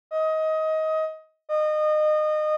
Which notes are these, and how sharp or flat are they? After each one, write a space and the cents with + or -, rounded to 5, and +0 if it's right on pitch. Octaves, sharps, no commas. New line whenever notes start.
D#5 +20
D#5 -25